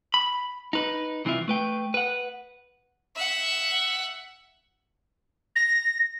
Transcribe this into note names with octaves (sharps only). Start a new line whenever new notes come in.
B5
D#4 B4
C2 E3 C4 D#4 F4 E5
A3 B4 G5
B4 F#5
E5 F#5
A#6